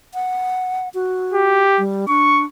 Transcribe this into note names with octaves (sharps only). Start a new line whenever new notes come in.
F#5
F#4
G4
G3
D4 C#6